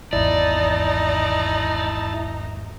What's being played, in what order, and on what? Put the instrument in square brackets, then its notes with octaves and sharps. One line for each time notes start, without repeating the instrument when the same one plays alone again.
[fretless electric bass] G#1 E2 [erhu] D#4 [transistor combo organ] E4 A5 [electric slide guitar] D5